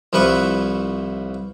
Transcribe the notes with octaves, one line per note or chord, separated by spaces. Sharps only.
C2 F3 E4 B4 C#6